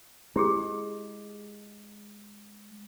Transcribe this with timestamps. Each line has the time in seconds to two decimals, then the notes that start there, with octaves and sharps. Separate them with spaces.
0.36 G#3 E4 G4 G#4